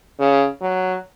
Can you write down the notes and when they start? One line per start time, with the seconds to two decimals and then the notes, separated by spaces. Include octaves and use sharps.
0.19 C#3
0.62 F#3